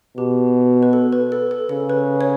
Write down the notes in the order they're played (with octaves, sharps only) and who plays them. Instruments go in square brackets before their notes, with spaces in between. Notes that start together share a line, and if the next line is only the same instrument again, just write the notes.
[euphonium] B2 [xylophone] G4
[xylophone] B4
A4
B4
A4
A4
[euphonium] C#3 [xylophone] A4
[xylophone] B4
C#5